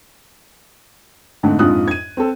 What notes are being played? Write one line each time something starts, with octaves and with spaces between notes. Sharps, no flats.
F2 G#2 D3 A3
A#1 F2 G#2 F4 D#6 F#6
G#6 D#7
C4 A4